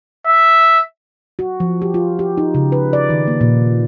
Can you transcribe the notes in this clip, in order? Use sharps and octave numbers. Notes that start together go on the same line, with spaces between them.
E5
F#4
F3
G4
F4
G4
D#4
C#3
B4
D5
D#3
A#3
A#2